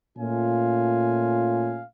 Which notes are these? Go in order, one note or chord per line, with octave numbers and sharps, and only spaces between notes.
A#2 A3 C#4 F4 F5 G#5